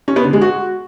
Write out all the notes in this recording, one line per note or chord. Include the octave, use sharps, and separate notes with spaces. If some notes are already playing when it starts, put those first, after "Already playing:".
C#4
B3
D3
G#3
F#4